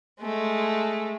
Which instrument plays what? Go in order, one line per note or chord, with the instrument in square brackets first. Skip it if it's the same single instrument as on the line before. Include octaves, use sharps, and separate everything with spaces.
[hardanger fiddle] G#3 A3